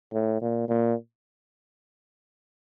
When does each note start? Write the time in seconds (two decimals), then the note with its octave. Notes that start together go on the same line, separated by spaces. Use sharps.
0.13 A2
0.41 A#2
0.69 A#2